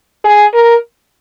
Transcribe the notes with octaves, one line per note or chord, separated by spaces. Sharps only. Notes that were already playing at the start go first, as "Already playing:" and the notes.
G#4
A#4